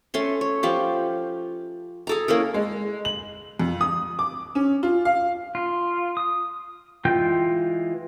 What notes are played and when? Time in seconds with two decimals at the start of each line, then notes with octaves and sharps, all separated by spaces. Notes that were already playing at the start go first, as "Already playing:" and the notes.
0.14 A3 C#4 C6
0.41 C#5
0.63 F3 F4 G4
2.07 G#4 A4 A#5
2.28 A#3 C#4 E4 A#4
2.54 G#3
3.05 F#7
3.60 F2
3.81 D#6
4.19 D6
4.55 C#4
4.83 F4
5.05 F5
5.55 F4
6.17 D#6
7.05 E3 G#3 F4 G5 G6